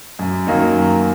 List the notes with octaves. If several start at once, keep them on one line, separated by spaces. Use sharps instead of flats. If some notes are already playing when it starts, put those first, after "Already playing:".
F#2
D#3 F#3 A#3 D#4
F#2